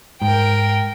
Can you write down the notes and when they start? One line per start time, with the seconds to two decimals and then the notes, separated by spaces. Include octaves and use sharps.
0.22 G#2 A#4 G5